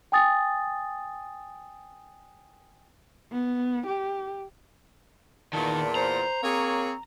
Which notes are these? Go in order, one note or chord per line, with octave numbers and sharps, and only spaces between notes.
G5 G#5 D#6 A6
B3
G4
E2 A#2 D#3 D4
C5 A#5
A#3 C4 G#4 C#5